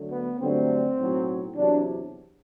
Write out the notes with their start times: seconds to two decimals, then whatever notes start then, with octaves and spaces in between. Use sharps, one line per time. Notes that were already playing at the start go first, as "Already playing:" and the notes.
Already playing: D2 D3 F#3 A3
0.11 B3
0.40 G2 D3 F#3 A3 C4
0.97 B1 A2 F#3
1.55 E2 C3 F#3 D4